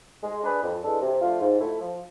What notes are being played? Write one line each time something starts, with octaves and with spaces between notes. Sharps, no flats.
G#3
D4 G#4 B4
F2
E3 G#3 D4 A4
C3
F3 A3 D4 F4
G#2
F3 A3 E4
F3